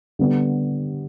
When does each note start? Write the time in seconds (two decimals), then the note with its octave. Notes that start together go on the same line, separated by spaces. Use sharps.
0.19 D3 G3 B3 G4